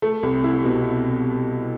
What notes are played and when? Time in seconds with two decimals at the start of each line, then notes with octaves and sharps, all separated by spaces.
0.02 A3
0.23 C2
0.44 E4
0.65 B2